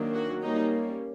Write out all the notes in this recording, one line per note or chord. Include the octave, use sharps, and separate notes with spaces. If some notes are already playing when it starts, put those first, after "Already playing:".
Already playing: D#3 F#3 A#3 D4
F#4
G3 A#3 C#4 D#4